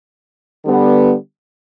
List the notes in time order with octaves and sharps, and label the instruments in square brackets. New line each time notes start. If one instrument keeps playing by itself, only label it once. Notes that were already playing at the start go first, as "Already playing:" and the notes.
[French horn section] D3 G3 B3